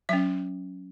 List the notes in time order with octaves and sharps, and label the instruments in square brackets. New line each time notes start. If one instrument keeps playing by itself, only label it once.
[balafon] F#3 C#4 E5